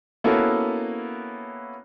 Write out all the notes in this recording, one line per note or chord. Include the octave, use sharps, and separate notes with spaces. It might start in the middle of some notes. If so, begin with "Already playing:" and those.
A#3 B3 C#4 E4 F#4 A4